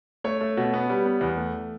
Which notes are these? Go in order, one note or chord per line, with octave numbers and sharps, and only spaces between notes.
A3 C#5
A3
B2
B3
G3
B3
E2
A3